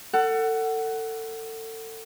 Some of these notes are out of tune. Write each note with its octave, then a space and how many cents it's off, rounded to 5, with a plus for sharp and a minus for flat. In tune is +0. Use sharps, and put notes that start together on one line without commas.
A4 +30 F#5 +15